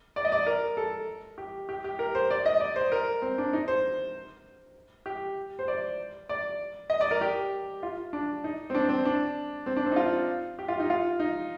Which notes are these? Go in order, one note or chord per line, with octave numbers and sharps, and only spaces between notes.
D5
D#5
D5
A#4
A4
G4
G4
G4
A#4
C5
D5
D#5
D5
C5
A#4
C4
D4
D#4
C5
G4
C5
D5
D5
D#5
D5
A#4
G4
F4
D4
D#4
C4
D4
C4
D4
C4
D4
C4
D#4
F4
G4
F4
D#4
F4
D#4